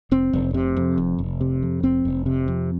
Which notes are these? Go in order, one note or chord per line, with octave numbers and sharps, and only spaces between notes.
F1 C4
F1
C3
F2
F1
F1
C3
F2
F1 C4
F1
C3
F2